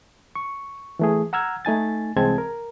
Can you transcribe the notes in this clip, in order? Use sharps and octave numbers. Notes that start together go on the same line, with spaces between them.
C#6
E3 A3 G#4
F#5 A#5 E6 F6 G#6
A3 D#4 G#5 A6
C2 E3 G#3 C4 A5 G#6
A#4